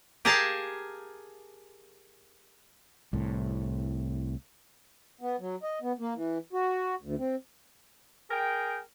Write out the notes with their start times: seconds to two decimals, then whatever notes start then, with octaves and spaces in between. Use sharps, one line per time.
0.25 G4 G#4 A#4 F5 G#5 A5
3.13 C2 A2
5.21 B3
5.40 F#3
5.63 D#5
5.82 B3
5.99 A#3
6.15 E3
6.53 F#4
7.02 D2
7.18 C4
8.30 G#4 A#4 G5